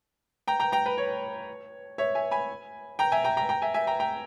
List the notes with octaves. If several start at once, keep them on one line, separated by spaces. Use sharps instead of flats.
G5 A#5
G5 A#5
G5 A#5
B4
C#5
C#5 E5
E5 G#5
G#5 B5
G5 A#5
E5 G#5
G5 A#5
G5 A#5
G5 A#5
E5 G#5
E5 G#5
G5 A#5
G5 A#5